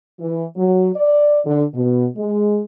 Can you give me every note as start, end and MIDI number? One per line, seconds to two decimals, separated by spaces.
0.20 0.45 52
0.56 0.90 54
0.96 1.39 74
1.46 1.64 50
1.74 2.06 47
2.16 2.60 56